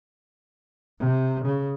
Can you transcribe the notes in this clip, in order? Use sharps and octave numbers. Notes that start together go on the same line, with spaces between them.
C3
C#3